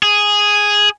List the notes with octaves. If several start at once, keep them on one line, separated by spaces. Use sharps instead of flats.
G#4